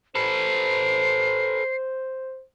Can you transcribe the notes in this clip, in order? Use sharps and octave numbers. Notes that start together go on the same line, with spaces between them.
A4 B4 C5 C7